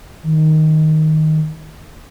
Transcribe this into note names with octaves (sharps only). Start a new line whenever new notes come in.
D#3